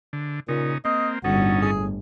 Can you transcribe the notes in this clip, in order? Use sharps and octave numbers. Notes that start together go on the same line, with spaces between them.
D3
A#2 C#3 D#4
A#3 C4 D#5
G1 A2 C#4 D#4 F#4 A4
G#4